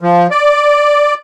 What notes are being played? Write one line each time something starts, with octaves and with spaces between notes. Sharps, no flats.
F3
D5